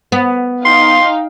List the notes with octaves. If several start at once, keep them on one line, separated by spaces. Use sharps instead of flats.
B3
D#4 F5 G5 C6